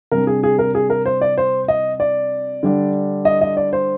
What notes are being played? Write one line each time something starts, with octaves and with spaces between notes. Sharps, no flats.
C3 G3 D4 A#4
G#4
G#4
A#4
G#4
A#4
C5
D5
C5
D#5
D5
D3 G3 D4
D#5
D#5
D5
C5